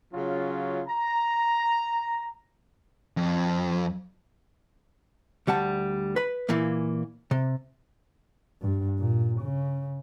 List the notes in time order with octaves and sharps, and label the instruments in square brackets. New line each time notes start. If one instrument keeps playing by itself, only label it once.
[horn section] C#3 F#3 C#4 F4
A#5
[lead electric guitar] F2
[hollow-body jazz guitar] D2 G3 F#5 A5
B4 B5
A#2 E3 A#3
C3
[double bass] G2
A#2
C#3